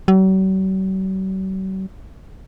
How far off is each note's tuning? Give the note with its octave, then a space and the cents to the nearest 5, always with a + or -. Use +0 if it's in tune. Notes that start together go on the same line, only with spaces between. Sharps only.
F#3 +45